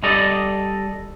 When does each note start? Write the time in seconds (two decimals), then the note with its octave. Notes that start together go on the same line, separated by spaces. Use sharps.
0.03 G3 A4 D5 D#5